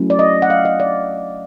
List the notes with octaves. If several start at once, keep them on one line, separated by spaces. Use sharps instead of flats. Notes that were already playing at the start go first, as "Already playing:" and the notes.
Already playing: F#3 A3 C#4 E4
D5
D#5
F#5
F5
D#5
D5